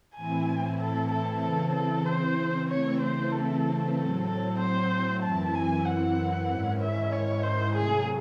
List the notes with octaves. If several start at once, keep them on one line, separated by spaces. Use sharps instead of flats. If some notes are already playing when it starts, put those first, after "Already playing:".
A2 E3 C4 E4 G#5
A4
A4
C#3 E3 C4 A4
A4
C5
C#3 E3 A3 C4 C#5
C5
A4
A2 F#3 C4 A4
A4
C5
F#2 E3 C4 E4 A5
G#5
F#5
G#2 D#3 G#3 C#4 E4
E5
C#5
C5
C3 F#3 A3 G#4